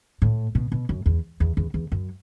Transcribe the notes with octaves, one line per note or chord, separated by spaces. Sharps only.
A2
B2
B2
F#2
E2
E2
E2
E2
F#2